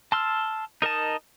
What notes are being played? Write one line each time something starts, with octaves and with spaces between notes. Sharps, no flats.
A5 C6 E6 F6
D#4 A#4 D#5 A5